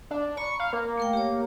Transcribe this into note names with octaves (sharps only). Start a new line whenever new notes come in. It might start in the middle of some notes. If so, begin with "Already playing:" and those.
D4
A#5 B5 C#6
F5
A#3
A3 A#4 G5
G4 C#5